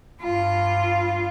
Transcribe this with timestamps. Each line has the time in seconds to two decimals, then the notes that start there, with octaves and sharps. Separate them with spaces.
0.23 G2 F4